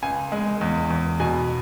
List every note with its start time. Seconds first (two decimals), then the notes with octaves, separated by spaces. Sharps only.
0.02 C#2 G#5
0.32 G#3
0.61 E2
0.90 E2
1.20 B2 G#5